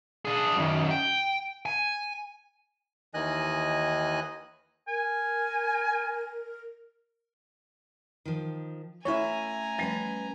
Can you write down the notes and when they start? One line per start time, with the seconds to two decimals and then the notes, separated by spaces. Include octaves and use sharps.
0.25 D4 G#4
0.56 F#2 D#3
0.91 G5
1.66 G#5
3.14 D#2 D#3 E3 D#5 G#5 F#6
4.88 A#4 G#5
8.25 D#3 F3
9.05 A3 C#4 E4 C#5 E5 G#5 A#5
9.78 F3 G3 A3 C#4 B4 D#5